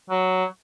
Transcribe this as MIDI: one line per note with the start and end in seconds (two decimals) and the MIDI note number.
0.10 0.44 54